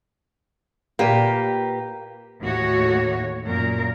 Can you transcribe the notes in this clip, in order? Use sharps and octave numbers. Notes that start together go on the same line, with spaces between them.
A#2 A#3 G4 B4
D#2 A2 F#4 C#5
F#2 A#2 A#4